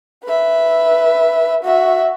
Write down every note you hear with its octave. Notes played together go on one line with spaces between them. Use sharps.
B4 E5
F#4 E5